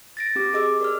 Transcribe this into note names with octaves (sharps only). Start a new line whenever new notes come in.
A6 A#6 D7
C4 G4 D6
G#4 D#5 D6 E6
A#4 D5 F6